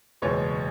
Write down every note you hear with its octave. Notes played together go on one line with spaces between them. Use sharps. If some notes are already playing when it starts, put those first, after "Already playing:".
F#1 E2 B2 G#3 C#5